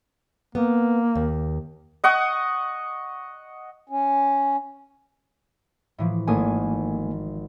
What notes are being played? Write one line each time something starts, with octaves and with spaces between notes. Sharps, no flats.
A#3 B3
D#2
D#5 F#5 C#6 D#6
C#4
A2 E3 F3
G#1 A3 A#3 G#5 D#6